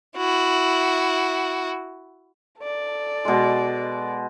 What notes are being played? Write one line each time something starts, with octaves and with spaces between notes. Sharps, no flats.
E4 F#4
A4 D5
B2 G#3